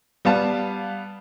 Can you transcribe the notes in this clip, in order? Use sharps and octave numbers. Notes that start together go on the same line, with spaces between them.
G3 B3 F5 A5